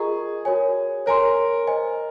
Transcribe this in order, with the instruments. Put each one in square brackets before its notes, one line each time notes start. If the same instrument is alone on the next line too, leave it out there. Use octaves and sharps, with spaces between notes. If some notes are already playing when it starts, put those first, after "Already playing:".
Already playing: [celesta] F4 A#4 D#5 A#5 C#6 [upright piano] G#4
[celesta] F#4 A#4 C#5 G#5
[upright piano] A#4 [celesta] C#5 G#5 C6
[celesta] C5 D#5 G#5